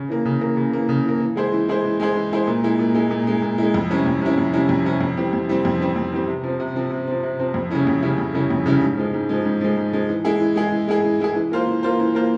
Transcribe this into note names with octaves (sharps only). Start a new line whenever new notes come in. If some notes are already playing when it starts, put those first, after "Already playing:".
Already playing: C#3
E3 A#3
C#3
E3 A#3
C#3
E3 A#3
C#3
E3 A#3
E3
G#3 E4 G#4 C5
E3
G#3 E4 G#4 C5
E3
G#3 E4 G#4 C5
E3
G#3 E4 G#4 C5
A#2
G#3 E4
A#2
G#3 E4
A#2
G#3 E4
A#2
G#3 E4
F2
C3 G3 C#4 E4
F2
C3 G3 C#4 E4
F2
C3 G3 C#4 E4
F2
C3 G3 C#4 E4
F2
E3 G3 C4 G4
F2
E3 G3 C4 G4
F2
E3 G3 C4 G4
F2
E3 G3 C4 G4
C3
F3 C4
C3
F3 C4
C3
F3 C4
C3
F3 C4
F2
C#3 G3 C#4 E4
F2
C#3 G3 C#4 E4
F2
C#3 G3 C#4 E4
F2
C#3 G3 C#4 E4
G#2
F3 G#3
G#2
F3 G#3
G#2
F3 G#3
G#2
F3 G#3
E3
G#3 E4 G#4
E3
G#3 E4 G#4
E3
G#3 E4 G#4
E3
G#3 E4 G#4
E3
A#3 F4 C5
E3
A#3 F4 C5
E3
A#3 F4 C5